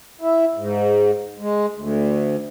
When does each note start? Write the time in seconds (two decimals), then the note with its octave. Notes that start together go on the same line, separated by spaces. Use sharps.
0.21 E4
0.56 G#2
1.39 G#3
1.75 D2